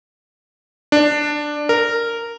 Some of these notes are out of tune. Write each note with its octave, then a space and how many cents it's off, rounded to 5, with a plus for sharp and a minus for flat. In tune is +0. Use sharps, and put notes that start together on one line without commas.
D4 +10
A#4 -10